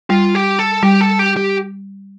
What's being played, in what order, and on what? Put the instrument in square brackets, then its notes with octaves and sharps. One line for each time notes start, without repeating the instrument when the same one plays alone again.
[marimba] G3 [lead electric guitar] F4
[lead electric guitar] G4
A4
[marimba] G3 [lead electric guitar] G4
[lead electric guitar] A4
G4
G4